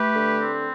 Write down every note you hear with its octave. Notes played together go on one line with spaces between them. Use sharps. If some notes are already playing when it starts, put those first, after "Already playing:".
Already playing: A3 G4 B4
D3
C4